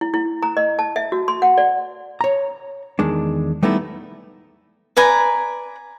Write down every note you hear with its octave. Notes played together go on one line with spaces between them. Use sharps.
E4
E4
A#5
D#5
A5
E5
F#4
C6
F#5
D5
C#5 A#5
E2 D#3 G#3 D4
G3 A3 B3 D#4 E4
B4 D5 G#5 A#5